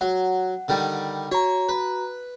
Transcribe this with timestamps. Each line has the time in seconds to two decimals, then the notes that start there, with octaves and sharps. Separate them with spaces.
0.01 F#3 F#5
0.68 D3 D#3 G3
1.31 F#4 C#5 A#5
1.69 B4